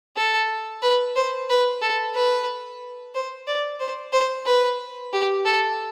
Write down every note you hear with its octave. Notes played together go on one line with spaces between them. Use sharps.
A4
B4
C5
B4
A4
B4
C5
D5
C5
C5
B4
G4
A4